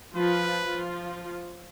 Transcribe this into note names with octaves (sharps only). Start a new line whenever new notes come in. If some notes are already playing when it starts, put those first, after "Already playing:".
F3 F4 B4
F3 F4